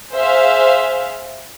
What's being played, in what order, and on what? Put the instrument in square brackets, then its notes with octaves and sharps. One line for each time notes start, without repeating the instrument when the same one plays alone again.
[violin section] G#4 C5 E5 F5